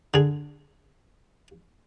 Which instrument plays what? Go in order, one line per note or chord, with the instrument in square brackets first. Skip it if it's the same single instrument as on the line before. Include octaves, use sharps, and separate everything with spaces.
[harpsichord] D3 G#4